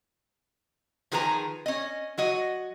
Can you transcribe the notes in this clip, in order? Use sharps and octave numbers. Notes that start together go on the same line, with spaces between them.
D#3 F3 G#4 B4 G#5 A#5
C#4 D#5
F#3 F#4 D#5